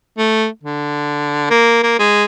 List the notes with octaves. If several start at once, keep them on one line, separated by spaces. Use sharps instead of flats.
A3
D3
A#3
A#3
G#3